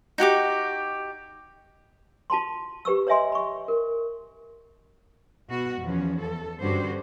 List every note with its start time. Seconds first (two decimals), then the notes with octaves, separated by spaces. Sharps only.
0.18 D#4 F#4 G4 D6
2.30 F4 A5 B5 C6
2.85 G4 B4 C#6 E6
3.07 B4 C#5 D#5 E5 G#5 C6
3.32 B5 C#6
3.68 A#4
5.49 B2 F#4
5.82 E2 F3 C#4
6.20 E2 A4
6.61 G2 D3 C#4 F#4 G4 C5